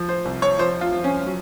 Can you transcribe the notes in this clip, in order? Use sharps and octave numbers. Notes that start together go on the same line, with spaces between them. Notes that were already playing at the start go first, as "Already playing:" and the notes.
Already playing: F3
C5
C2
C#5
F3 C5
F4
F3
C#4
F#3